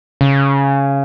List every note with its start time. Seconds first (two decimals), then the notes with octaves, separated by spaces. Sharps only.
0.21 C#3